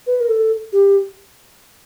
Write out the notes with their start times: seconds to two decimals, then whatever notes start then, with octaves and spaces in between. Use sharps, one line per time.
0.07 B4
0.20 A#4
0.29 A4
0.73 G4